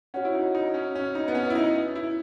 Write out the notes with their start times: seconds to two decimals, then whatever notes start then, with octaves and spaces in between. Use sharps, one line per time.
0.14 C#4 F#4 C#5 F#5
0.25 E4
0.35 D#4
0.55 D#4
0.74 C#4
0.95 C#4
1.15 D#4
1.28 B3
1.35 C#4
1.50 E4
1.55 D#4
1.95 E4